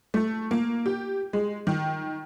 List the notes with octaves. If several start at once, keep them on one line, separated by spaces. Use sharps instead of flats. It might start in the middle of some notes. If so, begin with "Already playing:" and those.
A3
A#3
G4
G#3
D#3